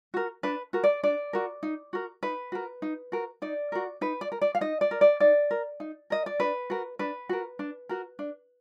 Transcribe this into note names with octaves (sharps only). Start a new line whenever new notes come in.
F#4 A#4
D4 B4
F#4 A#4
D5
D4 D5
F#4 A#4
D#4
F#4 A#4
D#4 B4
F#4 A#4
D#4
F#4 A#4
D#4 D5
F#4 A#4
D#4 B4
D5
A#4
D5
F5
D#4 D#5
D5
A#4
D5
D#4 D5
A#4
D#4
A#4 D#5
D5
D4 B4
F#4 A#4
D4 B4
F#4 A#4
D4
F#4 A#4
D4